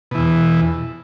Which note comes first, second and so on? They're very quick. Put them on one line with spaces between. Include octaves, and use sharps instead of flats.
B2 E3 E2